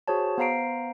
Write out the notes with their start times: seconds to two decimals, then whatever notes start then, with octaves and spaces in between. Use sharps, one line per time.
0.08 F#4 G#4 C5 C#5 A5
0.38 B3 C5 F5 A#5 C7 D7